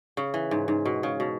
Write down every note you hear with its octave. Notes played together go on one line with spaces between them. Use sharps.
C#3
E3
G#2
G#2
B2
C#3
B2